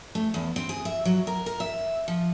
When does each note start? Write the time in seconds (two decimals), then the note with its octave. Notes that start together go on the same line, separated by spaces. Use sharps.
0.15 A3
0.34 E2
0.56 C4
0.69 G#4
0.85 E5
1.05 F#3
1.27 A#4
1.46 A#4
1.60 E5
2.08 F3